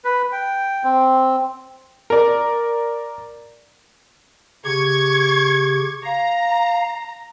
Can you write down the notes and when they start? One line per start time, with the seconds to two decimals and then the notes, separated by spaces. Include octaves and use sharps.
0.05 B4
0.32 G5
0.84 C4
2.10 A#4 D5
4.65 C#3 G4 C#6 G#6
6.05 F5 A#5